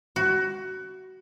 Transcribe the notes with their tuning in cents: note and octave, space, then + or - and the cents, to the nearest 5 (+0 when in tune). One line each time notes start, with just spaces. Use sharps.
F#4 +20